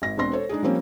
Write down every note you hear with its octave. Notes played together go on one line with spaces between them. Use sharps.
G#1 A#6
E1 B2 C4 D4 C6 A#6
A4 C5 C#5
G#3 D4 D#4 G#4
F3 G3 A#3 C4 C#4